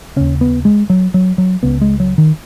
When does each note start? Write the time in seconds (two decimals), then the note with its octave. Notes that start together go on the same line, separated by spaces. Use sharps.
0.16 D#2 C#3 C#4
0.41 B3
0.65 G#3
0.90 F#3
1.14 F#3
1.38 F#3
1.63 C#2 C#3 B3
1.82 G#3
2.00 F#3
2.18 D#3